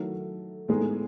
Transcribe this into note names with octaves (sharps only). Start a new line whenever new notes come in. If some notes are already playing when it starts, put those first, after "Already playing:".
Already playing: D#3 F#3 A3 E4
A2 G#3 B3 D#4 G#4